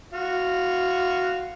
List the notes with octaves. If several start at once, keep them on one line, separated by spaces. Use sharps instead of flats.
F#4 F5